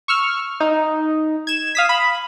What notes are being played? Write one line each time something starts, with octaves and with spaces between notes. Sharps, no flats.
C#6 E6 F6
D#4
G#6 E7
F5 D#6 B6
B5